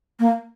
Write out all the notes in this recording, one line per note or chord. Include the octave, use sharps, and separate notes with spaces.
A#3